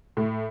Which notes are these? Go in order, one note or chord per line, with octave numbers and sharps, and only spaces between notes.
A2